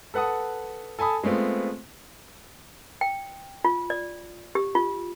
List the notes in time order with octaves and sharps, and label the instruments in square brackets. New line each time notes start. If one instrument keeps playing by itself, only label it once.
[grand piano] A4 B4 F#5 A5 D#6
A4 G#5 A5 B5 D#6
G#3 A3 B3 C4 F4
[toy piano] G5
F4
D5
G4
F4